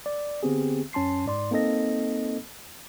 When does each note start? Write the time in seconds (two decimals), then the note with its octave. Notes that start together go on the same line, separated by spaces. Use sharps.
0.06 D5
0.43 D3 B3 C4 G4 G#4
0.93 F#2 C#4 A5 C6 C7
1.26 G#2 D5 C6
1.51 A#3 C4 D#4 A4 D#5 A#6